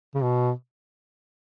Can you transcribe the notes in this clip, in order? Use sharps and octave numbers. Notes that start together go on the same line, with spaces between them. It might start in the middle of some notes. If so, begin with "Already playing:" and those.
C#3
B2